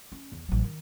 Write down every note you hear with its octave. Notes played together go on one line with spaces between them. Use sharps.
C#4
E2
A1 F#3
D#3